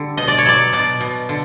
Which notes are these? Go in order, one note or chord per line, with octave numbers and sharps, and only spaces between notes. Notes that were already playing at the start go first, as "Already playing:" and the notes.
Already playing: D3 G3
B2 D#5
D5
C#5
F#3 D5
B2 D5
B2
D3